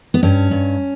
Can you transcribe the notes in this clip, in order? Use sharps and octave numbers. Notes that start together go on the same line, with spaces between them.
B3
G2 C#4
G2